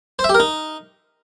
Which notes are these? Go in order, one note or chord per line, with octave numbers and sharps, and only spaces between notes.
C5
E5
G4
A#4
D#4